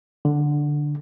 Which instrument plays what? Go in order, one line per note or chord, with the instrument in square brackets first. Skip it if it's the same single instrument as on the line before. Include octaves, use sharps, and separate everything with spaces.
[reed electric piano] D3